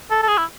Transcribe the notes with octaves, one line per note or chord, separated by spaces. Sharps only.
A4
A4
G#4
E4